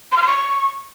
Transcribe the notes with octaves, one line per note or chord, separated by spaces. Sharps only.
C6
F6
C6
C#6